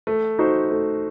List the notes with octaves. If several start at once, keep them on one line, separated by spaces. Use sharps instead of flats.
A3
D#4 F#4 C5
A3